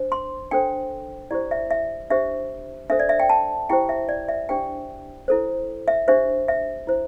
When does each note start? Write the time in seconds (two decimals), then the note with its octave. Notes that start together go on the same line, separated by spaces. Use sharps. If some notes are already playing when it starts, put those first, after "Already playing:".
Already playing: D4 C5
0.12 C6
0.51 D4 A4 C5 G5
1.31 E4 G4 C5 D5
1.51 E5
1.71 E5
2.10 D4 G4 C5 E5
2.90 D4 A4 C5 E5
3.00 D5
3.09 E5
3.20 G5
3.30 A5
3.70 E4 G4 C5 G5
3.89 E5
4.09 D5
4.29 E5
4.49 D4 G4 C5 G5
5.28 E4 A4 C5
5.88 E5
6.08 D4 G4 C5 E5
6.48 E5
6.87 E4 C5